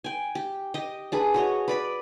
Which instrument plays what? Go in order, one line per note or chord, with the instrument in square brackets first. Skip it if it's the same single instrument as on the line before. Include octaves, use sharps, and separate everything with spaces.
[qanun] G5 G#5
G4
G4 D#5
D4 G#4 B4
F#4 C#5 D#5
B4 D5 B5